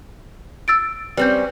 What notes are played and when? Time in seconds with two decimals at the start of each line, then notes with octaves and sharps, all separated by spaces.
0.68 E6 A6 D7
1.17 G3 C4 C#4 B4 G6